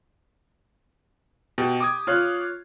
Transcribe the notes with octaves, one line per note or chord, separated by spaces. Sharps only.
B2 G4
D6 D#6 G#6
F4 C#5 F#6